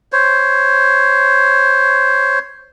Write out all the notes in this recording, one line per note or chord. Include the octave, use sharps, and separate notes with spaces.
C5 C#5